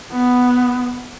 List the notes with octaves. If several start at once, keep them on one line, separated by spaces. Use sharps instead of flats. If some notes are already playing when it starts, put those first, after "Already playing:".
B3